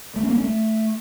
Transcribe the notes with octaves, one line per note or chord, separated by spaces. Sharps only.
A3
C#4
A#3
C#4
A3